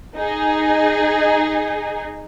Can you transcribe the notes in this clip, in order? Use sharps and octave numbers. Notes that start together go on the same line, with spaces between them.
D#4 G#4